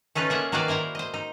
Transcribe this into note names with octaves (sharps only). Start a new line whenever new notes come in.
A3 C#4 D#4 F4 B4
A#3 G#4 E5 F#5
D#3 A#3 F#4 B4 D5 F5
E4 A#4 C5 A#5
C5 D#5
D#4